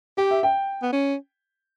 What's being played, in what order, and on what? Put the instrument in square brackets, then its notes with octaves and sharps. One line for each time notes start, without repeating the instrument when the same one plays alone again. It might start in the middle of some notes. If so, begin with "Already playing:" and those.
[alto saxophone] G4 [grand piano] G5
[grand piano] E5
G5
[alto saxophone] B3
C#4